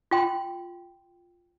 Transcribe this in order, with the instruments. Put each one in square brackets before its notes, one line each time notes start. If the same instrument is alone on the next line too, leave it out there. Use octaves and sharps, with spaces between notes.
[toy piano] F4 G5 C6